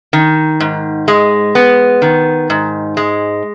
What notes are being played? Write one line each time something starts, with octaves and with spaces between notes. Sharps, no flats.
D#3
G#2
G#3
B3
D#3
G#2
G#3